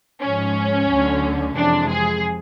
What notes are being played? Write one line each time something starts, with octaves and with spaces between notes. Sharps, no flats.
G#2 F3 G#3 C#4
D2 D3 F#3 A3
F2 C3 E3 G#3 D4
G#4